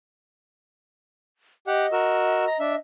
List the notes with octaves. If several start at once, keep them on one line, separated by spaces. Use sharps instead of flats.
G4 D#5 F#5
F#4 A#4 E6
A#5
D4 E5